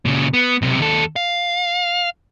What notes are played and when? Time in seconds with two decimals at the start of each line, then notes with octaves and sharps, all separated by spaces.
0.05 A#2 C#3
0.34 B3
0.62 B1 C3
0.80 D#2 A4
1.16 F5